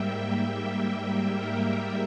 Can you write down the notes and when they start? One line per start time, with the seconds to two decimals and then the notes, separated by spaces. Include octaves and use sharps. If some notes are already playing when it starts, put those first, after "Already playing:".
Already playing: G#2 G3 A#3 E5 G5
0.19 E5
1.35 A#4